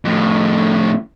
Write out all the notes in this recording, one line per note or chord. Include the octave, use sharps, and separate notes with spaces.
F2 A2